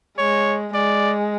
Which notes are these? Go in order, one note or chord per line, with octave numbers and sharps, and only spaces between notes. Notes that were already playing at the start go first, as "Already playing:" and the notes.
G#3 C#5
G#3 D5